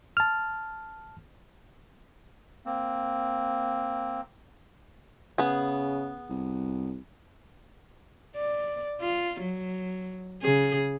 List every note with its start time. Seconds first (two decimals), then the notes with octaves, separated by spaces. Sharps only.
0.17 A5 F6
2.65 A#3 C4
5.38 C#3 B3 G#4
6.30 C2
8.36 D5
9.01 F4
9.41 F#3
10.42 C#3 G#4